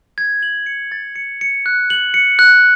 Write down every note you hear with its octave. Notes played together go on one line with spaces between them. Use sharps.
G#6
F#7
C#7
A6
C#7
C#7
F#6
F#7
C#7
F#6